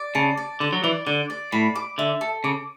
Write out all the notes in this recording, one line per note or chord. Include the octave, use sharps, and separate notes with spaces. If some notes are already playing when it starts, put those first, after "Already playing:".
Already playing: D5
C#3 A5
D5
D3 D5
F#3
E3 D5
D3 D5
D5
A2 B5
D6
D3 E5
A4
C#3 D6